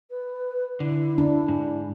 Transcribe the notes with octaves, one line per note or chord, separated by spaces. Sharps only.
B4
D3 E4
D4
G#2